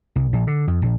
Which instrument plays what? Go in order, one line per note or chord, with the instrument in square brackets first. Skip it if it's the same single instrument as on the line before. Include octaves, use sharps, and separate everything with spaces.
[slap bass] C2
A#1
D3
F2
A#1